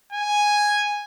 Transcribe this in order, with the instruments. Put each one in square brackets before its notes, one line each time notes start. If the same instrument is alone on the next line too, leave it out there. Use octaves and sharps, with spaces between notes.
[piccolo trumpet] G#5